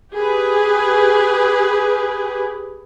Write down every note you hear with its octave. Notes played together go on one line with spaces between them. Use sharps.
G4 G#4 B4